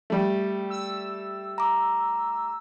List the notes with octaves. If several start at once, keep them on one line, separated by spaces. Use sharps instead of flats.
G3 A3
E6
A#5 D6